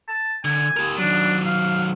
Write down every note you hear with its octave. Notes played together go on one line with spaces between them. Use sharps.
A5
D3 G#5
G4 A#4
D#3 F#3 D4
F5